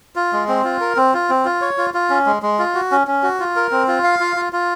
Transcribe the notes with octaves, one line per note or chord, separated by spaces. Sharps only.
F4
G#3
C4
F4
A#4
C4
F4
C4
F4
C#5
F4
F4
C#4
G#3
G#3
F4
F#4
C#4
C#4
F#4
F4
A#4
C4
F4
F5
F4
F4
F4